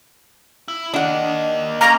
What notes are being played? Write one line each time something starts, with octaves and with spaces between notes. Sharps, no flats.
E4
A#3 D4 D#5 F#5
A#3 C#4 A#5